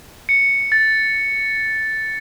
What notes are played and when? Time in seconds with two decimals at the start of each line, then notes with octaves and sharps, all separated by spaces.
0.29 C#7
0.72 A6